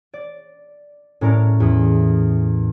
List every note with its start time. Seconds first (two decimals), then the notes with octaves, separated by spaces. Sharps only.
0.13 D5
1.21 A2 C#4 A#4 D5 A#5
1.60 E2 D#6